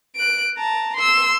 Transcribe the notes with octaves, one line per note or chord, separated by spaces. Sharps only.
F#6 D7
A5 A#5
C6 E6